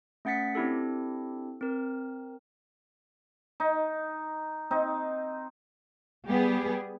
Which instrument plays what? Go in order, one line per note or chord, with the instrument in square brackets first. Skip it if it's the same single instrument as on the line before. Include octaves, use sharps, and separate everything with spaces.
[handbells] A3 C#4 F#5 A6 B6 C#7
C4 D4 E4 G4 A4
C4 A#4
[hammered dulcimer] D#4
C4 D#4
[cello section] G3 B3 G4 G#4